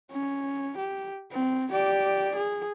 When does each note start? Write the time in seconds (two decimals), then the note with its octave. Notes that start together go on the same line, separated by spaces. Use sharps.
0.11 C#4
0.78 G4
1.32 C4
1.72 G4 D5
2.36 G#4